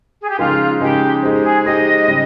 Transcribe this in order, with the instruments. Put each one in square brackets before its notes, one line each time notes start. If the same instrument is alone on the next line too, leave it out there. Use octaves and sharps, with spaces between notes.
[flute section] G#4
G4
[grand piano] C#3 F3 G#3 D#4 G#4 [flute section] F4
[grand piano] C#3 F3 G#3 D#4 G#4 [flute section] G4
[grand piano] G#3 D#4 G4 C5
[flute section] G#4
[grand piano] G#3 D#4 G4 C5 [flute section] D#5
[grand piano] C#3 G3